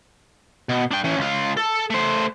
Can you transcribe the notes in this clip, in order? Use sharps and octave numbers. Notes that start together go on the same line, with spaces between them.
B2
D4 G5
E3 C#4
C#2 F4
A4
A3 C5